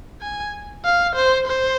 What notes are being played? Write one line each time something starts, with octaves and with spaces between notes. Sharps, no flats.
G#5
F5
C5
C5